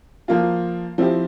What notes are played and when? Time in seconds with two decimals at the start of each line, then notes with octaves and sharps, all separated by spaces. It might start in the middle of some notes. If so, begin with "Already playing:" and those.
0.28 F3 A#3 F4
0.98 F3 C4 E4 G4